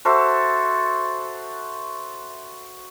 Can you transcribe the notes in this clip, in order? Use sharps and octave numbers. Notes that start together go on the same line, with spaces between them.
F#4 A4 C5 E5